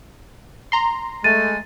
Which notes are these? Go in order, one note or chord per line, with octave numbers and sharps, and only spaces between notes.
A#5 C6
G#3 A3 A6 D#7